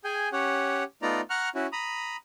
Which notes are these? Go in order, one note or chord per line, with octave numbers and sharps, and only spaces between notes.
G#4 G5 G#5
C#4 G4 C#5 F#5
A3 B3 D#4 F4 D5 A#5
F#5 A#5 C#6 F6 F#6
C#4 E4 F#4
A#5 B5 D#6